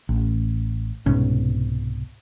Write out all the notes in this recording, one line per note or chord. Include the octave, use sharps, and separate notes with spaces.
A1
C2 G#2 B2 C#4